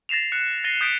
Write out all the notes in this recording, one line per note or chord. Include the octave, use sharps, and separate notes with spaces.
A6 A#6 C7 E7 F7
F#6 C#7
A6 A#6 C7 D#7 G7
D#6 G6 A6 B6 C#7 D7